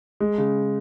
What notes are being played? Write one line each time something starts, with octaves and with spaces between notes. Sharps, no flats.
G#3
C#3